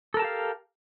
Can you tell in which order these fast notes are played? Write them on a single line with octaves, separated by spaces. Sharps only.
A4 A#4 A5 G4 F5